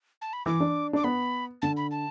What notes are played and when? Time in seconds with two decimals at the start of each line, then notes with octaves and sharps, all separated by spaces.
0.22 A5
0.33 B5
0.46 E3 D6
0.60 D4
0.93 D4 D6
1.04 B3 B5
1.62 D3 A5
1.77 B5
1.91 A5